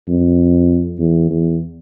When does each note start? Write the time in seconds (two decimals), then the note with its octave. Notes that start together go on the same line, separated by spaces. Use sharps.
0.08 F2
0.99 E2
1.30 E2